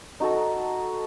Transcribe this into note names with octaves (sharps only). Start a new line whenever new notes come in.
D#4 F#4 A4